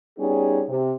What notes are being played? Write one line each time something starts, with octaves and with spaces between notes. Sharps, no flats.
G3 B3 C#4 D#4 G#4
C3